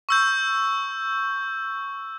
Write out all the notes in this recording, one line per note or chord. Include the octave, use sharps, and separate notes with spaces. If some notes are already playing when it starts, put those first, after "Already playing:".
C#6 E6 G6